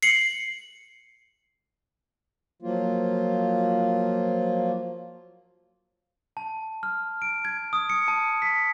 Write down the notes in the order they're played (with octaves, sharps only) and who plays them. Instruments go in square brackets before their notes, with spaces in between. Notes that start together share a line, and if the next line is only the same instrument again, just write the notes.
[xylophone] C7 C#7 F#7
[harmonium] F3 F#3 A#3 F4
[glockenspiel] A5
F6
D7
G#6
D#6
C#7
A5
B6